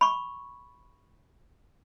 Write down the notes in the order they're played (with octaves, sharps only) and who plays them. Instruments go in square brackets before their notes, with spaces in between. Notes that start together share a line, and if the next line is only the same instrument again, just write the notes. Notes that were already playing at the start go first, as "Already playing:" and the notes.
[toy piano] B5 C#6